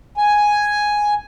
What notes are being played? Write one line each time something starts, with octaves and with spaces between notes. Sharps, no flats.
G#5